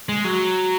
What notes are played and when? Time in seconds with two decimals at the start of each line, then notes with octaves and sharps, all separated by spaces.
0.09 G#3
0.24 F#3